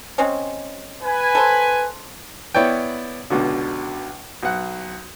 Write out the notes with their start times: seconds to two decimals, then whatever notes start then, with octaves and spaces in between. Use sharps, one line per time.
0.18 G#3 C4 C#4
1.04 B4 G#5
1.35 A4 C5
2.55 B3 E4 C#5 D5 G5
3.30 C#2 B2 D3
4.43 B1 F#5